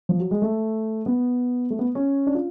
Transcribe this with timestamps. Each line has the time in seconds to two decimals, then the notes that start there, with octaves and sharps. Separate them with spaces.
0.09 F3
0.20 F#3
0.31 G#3
0.42 A3
1.06 B3
1.70 A3
1.79 B3
1.95 C#4
2.27 D4
2.35 F4